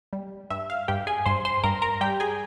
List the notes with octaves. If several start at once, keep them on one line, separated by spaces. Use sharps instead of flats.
G3
G2 E5
F5
G2 G4 G5
G#4 G#5
G2 C5 C6
C5 C6
G2 A#4 A#5
A#4 A#5
G3 G4 G5
G#4 G#5